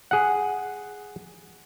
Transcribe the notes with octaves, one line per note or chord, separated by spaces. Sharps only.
G#4 F#5